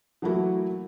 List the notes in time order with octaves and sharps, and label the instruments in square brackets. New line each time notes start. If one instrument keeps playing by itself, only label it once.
[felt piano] E3 F#3 A3 A#3 E4 F#4